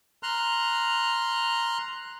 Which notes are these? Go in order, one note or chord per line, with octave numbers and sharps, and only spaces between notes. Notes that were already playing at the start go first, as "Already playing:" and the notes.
A#5 C6 F6 F#6